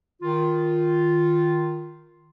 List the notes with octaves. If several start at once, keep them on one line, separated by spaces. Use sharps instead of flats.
D#3 F4